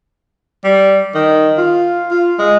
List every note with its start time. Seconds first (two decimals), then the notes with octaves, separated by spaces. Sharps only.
0.64 G3
1.14 D#3
1.57 F4
2.10 F4
2.39 G#3